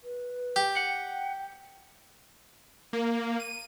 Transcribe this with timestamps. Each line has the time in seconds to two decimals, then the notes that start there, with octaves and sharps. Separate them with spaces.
0.04 B4
0.56 G4
0.77 F#5 G5
2.93 A#3
3.40 D#7